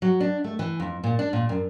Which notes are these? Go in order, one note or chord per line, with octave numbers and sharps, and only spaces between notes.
F#3
D4
A3
E3
F2
A#2
D4
A#2
F#2